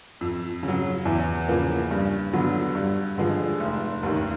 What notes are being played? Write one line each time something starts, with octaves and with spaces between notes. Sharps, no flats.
F2
C#3
F#3
E2
C#3 F3 A#3
G2
D3 F#3 B3
G2
D3 F3 G#3
F1
D#2 D#3